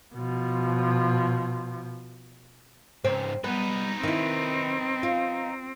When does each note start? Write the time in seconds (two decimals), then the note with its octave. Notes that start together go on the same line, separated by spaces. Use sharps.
0.15 B2 F3
3.04 C#2 G#2 C4
3.44 G3 B3 D#4 B4
4.03 D#3 C4 E4
5.03 F4